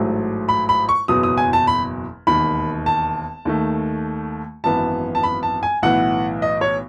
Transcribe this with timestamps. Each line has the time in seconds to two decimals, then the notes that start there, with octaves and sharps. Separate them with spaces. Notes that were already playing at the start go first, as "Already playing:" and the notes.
Already playing: A1 G#2 F#3 A3
0.49 B5
0.69 B5
0.89 C#6
1.08 F#1 E2 B2 F#3 D#6
1.23 D#6
1.38 G#5
1.53 A5
1.67 B5
2.27 E1 D#2 D#3 B5
2.86 A5
3.45 D#2 D#3 A3
4.64 G#1 F#2 E3 B3 A5
5.15 A5
5.23 B5
5.43 A5
5.63 G#5
5.83 B1 A2 E3 F#5
6.42 D#5
6.61 C#5